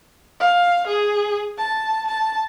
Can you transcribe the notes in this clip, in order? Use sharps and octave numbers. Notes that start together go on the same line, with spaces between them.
F5
G#4
A5
A5